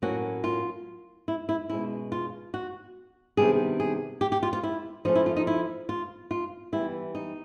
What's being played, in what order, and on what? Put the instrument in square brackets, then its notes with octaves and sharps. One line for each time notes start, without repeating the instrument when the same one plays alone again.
[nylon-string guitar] A2 F#3 A#3 C#4 F#4
F4
E4
E4
B2 G#3 C#4 E4
F4
F#4
C3 D#3 G3 B3 D4 G#4
G#4
G4
G4
F4
F4
E4
F3 A3 C#4 D#4
E4
F4
D#4
E4
F4
F4
E3 G3 B3 E4
D#4